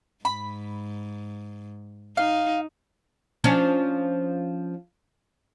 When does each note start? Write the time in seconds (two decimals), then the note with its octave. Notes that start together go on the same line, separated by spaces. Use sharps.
0.25 G#2 B5
2.17 D#4 F5
3.44 F3 C#4 D4